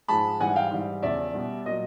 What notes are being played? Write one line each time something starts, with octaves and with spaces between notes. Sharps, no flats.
G#2 F3 G#3 A5 B5
G#2 E3 G3 F#5 G#5
F5 G5
G#2 E3 G3
E2 C#3 F3 D5 E5
B2 G3
A#2 F#3 D#5